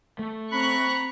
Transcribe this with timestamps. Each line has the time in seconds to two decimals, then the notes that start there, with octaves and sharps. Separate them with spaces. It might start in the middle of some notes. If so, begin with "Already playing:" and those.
0.19 A3
0.52 C4 A#5 B5 C#6 F#6